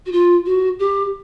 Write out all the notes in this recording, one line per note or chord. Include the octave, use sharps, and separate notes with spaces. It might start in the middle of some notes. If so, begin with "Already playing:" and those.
F#4
F4
F#4
G4